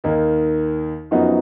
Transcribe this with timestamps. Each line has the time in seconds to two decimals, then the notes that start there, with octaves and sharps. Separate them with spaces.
0.04 D#2 D#3 A#3 D#4
1.11 F#2 F3 B3 D#4 F#4